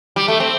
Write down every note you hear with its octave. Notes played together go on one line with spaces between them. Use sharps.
G3
A3
C4